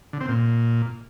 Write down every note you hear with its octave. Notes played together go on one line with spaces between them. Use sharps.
D3
C4
A#2